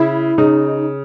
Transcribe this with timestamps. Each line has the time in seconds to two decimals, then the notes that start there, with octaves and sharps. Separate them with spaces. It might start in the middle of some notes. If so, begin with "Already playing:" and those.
Already playing: C#3 E4
0.38 C#3 D#4